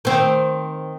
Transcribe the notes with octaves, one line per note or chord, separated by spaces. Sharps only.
D#3 C4